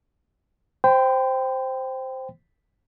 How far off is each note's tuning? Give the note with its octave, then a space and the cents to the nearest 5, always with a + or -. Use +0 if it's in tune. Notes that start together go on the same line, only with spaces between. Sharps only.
C5 +0 G5 +0 C6 -45